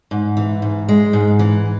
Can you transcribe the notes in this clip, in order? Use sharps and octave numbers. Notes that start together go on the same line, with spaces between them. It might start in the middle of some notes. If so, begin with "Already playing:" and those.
G#2
E3
G#2
G#3
G#2
E3